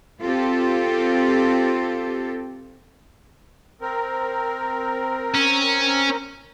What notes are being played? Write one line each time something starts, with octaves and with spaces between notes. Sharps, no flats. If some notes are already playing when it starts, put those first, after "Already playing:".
C4 F4 G4 A4
C4 A#4
C#4